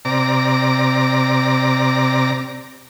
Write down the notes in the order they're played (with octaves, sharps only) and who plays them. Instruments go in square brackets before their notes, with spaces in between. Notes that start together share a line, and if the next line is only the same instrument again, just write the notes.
[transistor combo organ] C3 D5 A#5